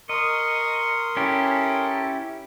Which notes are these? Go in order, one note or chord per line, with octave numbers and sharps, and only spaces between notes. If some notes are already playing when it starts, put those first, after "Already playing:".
A#4 D#5 C6 C#6 D#6
C#4 E4 G4 A4